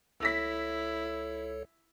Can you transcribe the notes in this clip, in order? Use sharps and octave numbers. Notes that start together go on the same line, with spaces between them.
C#2 E4 A4 C#5 E6 A#6 B6